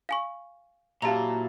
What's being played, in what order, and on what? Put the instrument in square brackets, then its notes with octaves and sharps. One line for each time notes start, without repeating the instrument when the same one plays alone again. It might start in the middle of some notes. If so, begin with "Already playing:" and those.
[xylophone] F5 G#5 C#6
[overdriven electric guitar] A#2 [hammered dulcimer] F#3 E4 [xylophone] G4 F7 [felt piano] F5 A5 A#5